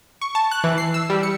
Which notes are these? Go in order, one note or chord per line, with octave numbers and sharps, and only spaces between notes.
C#6
A5
F#6
E3
C7
E6
G3
C#7